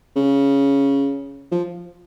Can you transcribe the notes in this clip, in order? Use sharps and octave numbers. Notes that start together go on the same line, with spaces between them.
C#3
F3